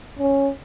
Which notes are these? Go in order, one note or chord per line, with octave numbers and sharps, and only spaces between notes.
C#4